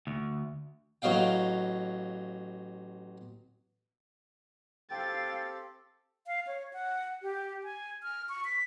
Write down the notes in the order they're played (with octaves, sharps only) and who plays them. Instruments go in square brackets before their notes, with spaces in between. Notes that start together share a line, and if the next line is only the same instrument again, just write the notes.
[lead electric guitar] D2
[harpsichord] A1 F#3 D#5 F5 G5
[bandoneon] C4 G4 A4 [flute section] F5 [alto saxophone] G5 [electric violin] A6
[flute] F5
C#5
F#5
G4
G#5
F6
C#6
B6